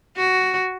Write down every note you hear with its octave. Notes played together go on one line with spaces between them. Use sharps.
F#4